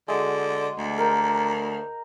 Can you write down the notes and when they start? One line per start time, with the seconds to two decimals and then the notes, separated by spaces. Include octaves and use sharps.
0.08 D3 G#3 F#4
0.78 D2
0.98 A#4 G5